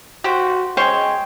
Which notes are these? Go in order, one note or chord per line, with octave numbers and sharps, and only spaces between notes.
F#4 G4 C5
G#3 C#4 C5 C#5 G5